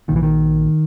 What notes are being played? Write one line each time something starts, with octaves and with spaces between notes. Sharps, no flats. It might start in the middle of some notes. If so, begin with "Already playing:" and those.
A#1 A#2 D#3 E3
D#3